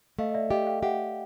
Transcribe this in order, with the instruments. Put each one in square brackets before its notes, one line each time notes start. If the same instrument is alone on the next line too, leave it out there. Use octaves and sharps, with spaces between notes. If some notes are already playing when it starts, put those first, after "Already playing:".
[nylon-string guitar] A3 [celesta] D#5 F5
[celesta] D#5
D5 E5
[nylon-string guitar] G4 [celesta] D#5 F5
[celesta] F5 G5
[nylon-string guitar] G4 [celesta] E5 F#5